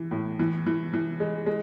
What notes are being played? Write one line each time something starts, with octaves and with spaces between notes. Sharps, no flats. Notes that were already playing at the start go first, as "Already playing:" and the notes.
Already playing: E3
A2
E3
E3
E3
G#3
G#3